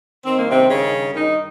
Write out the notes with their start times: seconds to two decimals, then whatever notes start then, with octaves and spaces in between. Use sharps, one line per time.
0.24 G2 D#3 C4
0.37 A#3
0.50 C3 C4
0.68 C#3 C#4
1.14 D#3 D#4